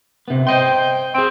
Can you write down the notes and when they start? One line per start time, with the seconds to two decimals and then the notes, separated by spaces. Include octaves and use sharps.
0.28 C3 B3
0.47 C5 D#5 G5 C6
1.15 C4 G#4 G5